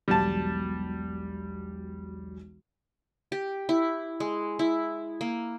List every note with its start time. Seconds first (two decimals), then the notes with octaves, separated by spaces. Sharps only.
0.08 E1 B1 G3 A5
3.32 G4
3.69 E4
4.20 G#3
4.59 E4
5.21 A#3